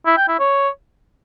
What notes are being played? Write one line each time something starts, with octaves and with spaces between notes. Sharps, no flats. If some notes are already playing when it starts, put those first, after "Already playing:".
E4
G5
E4
C#5